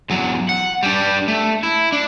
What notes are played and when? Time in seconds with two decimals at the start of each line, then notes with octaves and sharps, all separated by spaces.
0.10 E2 F#3
0.49 F#5
0.83 G3 D4
1.28 A3
1.63 E4
1.92 D4